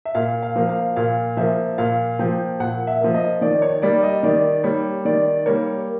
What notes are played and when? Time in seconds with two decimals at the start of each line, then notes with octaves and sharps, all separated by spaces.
0.05 E5
0.15 A#2 F5
0.43 F5
0.56 F3 A#3
0.69 F5
0.96 A#2 F5
1.37 F3 A#3 E5
1.78 A#2 F5
2.19 F3 A#3 G5
2.60 A#2 F#5
2.87 E5
3.01 F3 A#3
3.14 D#5
3.41 D#3 D5
3.62 C#5
3.82 G3 A#3 D5
4.03 D#5
4.23 D#3 D5
4.64 G3 A#3 C#5
5.05 D#3 D5
5.46 G3 A#3 C#5